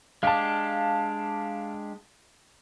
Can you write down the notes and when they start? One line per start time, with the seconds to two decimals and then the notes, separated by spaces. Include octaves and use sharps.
0.23 G#3 D4 G4 F5 A5